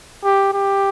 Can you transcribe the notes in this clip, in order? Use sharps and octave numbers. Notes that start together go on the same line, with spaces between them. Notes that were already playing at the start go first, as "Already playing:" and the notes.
G4
G4